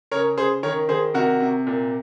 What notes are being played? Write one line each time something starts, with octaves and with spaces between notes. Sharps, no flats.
C#3 A#4 C#5
C#3 G#4 C5
D#3 A#4 C#5
D#3 G#4 C5
C3 F#4 A#4
C3
A#2